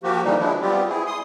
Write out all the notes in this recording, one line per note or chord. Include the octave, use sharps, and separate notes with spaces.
F3 A#3 F#4 G4
D3 E3 G3 A#3 D#4
F3 F#3 G#3 D4 E4
G3 B3 C4 F4 G4
E4 G#4
C6 D#6